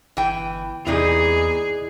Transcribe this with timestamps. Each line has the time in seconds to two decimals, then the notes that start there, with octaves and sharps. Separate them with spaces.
0.17 G1 E3 G5
0.87 E2 C3 E3 D#4 E4 G#4 D5 D#5